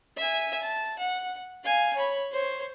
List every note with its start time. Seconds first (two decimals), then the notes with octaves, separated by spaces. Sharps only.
0.17 E5 G#5
0.63 A5
0.99 F#5
1.64 F5 G#5
1.96 C#5 B5
2.31 C5 C#5